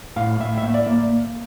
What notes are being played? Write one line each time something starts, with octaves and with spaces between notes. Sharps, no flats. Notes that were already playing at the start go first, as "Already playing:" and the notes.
A2 F5
A2 E5
E5
A#3
D5
A#3